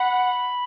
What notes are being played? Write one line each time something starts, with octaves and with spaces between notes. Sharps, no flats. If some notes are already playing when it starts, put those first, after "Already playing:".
Already playing: F#5 B5